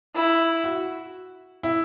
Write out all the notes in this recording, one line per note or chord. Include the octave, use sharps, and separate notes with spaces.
E4
F#4
E4